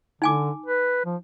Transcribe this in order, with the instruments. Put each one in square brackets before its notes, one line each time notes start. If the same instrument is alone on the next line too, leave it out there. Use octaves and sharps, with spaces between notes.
[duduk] D3 [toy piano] D#4 G#5 D6
[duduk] B4
F3